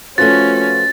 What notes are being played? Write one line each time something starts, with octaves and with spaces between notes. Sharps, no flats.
F3 A3 C#4 F4 F#4 B4 A6